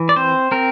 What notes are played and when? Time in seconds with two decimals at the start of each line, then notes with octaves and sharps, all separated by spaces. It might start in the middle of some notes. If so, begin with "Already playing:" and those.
Already playing: E3
0.09 D5
0.16 C4 C5
0.51 C4 A#4